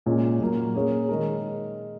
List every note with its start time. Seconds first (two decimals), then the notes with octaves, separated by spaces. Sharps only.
0.06 A#2 G#3 C#4
0.40 A#2 F#3 A#3
0.74 A#3 C#4 G#4 C#5
1.09 D#3 G#3 D#4 A#4